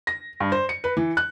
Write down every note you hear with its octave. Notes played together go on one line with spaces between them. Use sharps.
A#6
G2
C5
C#7
B4
E3
F#6